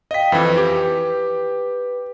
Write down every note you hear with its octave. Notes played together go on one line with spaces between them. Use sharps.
D#5 F5 G5 B6
F2 E3 B4
G4